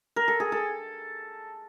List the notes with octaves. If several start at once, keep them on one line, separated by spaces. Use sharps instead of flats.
A#4
A4
G#4
A4